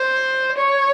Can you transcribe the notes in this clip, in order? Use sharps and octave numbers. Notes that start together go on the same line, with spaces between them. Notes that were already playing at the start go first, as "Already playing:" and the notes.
Already playing: C5
C#5